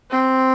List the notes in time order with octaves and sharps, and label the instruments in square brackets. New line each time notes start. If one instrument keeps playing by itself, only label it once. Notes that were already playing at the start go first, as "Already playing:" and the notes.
[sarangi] C4